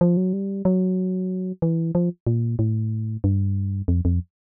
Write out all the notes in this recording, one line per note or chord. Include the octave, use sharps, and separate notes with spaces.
F3
F#3
G3
F#3
E3
F3
A#2
A2
G2
F2
F2